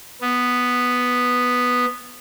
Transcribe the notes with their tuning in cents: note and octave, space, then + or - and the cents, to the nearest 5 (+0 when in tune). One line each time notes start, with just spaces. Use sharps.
B3 +0